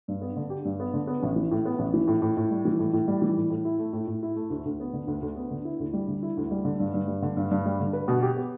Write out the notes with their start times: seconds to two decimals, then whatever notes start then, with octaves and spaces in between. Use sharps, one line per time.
0.08 G2
0.21 B3
0.37 D3
0.50 G4
0.65 G2
0.80 B3
0.94 D3
1.07 B3
1.23 A1
1.36 E3
1.51 A2
1.65 B3
1.79 A1
1.94 E3
2.08 A2
2.22 A2
2.37 A2
2.51 G3
2.65 E3
2.79 A2
2.93 A2
3.08 G3
3.22 E3
3.36 A2
3.50 A2
3.65 E4
3.79 A3
3.93 A2
4.07 A2
4.23 E4
4.36 A3
4.50 D2
4.66 D2
4.80 B3
4.93 D3
5.07 D2
5.22 D2
5.36 B3
5.51 D3
5.65 E4
5.80 D2
5.93 G3
6.08 D3
6.22 E4
6.37 D2
6.51 G3
6.65 D3
6.80 G2
6.94 G2
7.08 G3
7.22 D3
7.37 G2
7.51 G2
7.66 G3
7.80 D3
7.93 B4
8.08 B2
8.23 G4
8.37 B3